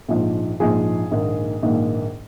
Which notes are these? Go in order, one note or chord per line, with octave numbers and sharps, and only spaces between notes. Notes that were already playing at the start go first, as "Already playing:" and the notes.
A#1 G#2 F3
A#1 G#2 F3 G#4
A#1 G#2 D#3 A#3
A#1 G#2 D#3 A#3